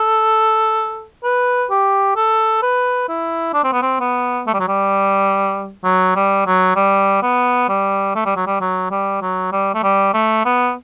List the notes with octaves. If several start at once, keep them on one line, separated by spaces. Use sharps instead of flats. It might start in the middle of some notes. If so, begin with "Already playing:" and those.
Already playing: A4
B4
G4
A4
B4
E4
D4
C4
B3
C4
B3
A3
G3
F#3
G3
F#3
G3
F#3
G3
B3
G3
A3
G3
F#3
G3
F#3
G3
F#3
G3
A3
G3
A3
B3